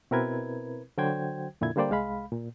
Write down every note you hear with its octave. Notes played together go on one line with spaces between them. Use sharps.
B2 C4 E4 A#4 B4 G#6
D3 F#3 F#4 C5 G5 G#6
F2 A#2 D3 E4 G#6
D3 G3 A#3 C5 D5 G5
C2 G#3 F5 B5
A#2